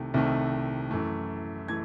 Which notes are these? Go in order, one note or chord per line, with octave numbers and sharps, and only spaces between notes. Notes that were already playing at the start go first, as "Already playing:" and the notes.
Already playing: C2 C3 D#3 A3
C2 C3 D#3 A3
F#2 E3 A3
E3 A3 G#6